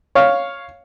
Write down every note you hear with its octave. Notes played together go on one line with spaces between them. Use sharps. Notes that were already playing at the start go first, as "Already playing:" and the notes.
C#5 F5